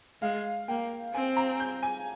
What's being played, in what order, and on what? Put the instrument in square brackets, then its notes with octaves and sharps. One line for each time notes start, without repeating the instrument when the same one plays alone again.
[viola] G#3 [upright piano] F5
[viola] A#3 [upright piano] G5
[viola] C4 [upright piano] G#5
[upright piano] A#5
G6
G#5